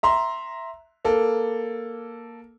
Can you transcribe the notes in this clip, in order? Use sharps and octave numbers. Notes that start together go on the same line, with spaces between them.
E5 A#5 C6
A#3 A4